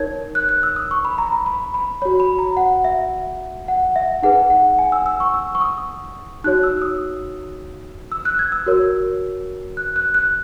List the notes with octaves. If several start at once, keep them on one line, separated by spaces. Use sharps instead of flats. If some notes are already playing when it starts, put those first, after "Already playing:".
Already playing: D#4 A#4 C#5 G#6
F#6
F#6
E6
D#6
C#6
B5
A#5
B5
B5
B5
F#4 C#5 B5
B5
A#5
F#5
E5
F#5
E5
D#4 G#4 B4 F#5
F#5
G#5
E6
E6
C#6
E6
C#6
D#6
D#4 F#4 C#5 F#6
E6
D#6
E6
F#6
G#6
E6
F#4 A#4 C#5
F#6
F#6
F#6